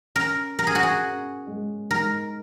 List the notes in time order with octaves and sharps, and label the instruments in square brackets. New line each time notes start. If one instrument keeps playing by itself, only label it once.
[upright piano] C#4 [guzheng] A#4
[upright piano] C#4 [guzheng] A#4
[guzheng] G#4
F#4
G#4
[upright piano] C#4
G#3
[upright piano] G#2 [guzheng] A#4